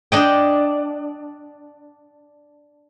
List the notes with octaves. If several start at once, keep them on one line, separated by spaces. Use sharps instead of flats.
D4 D#5 G5